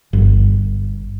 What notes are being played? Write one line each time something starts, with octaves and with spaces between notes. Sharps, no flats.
G1